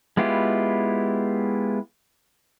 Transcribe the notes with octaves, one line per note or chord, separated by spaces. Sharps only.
G#3 B3 E4 F4 G4